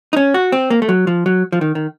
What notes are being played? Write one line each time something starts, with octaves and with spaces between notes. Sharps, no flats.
D#4
C#4
F#4
C4
A#3
A3
F#3
F3
F#3
F3
D#3
D#3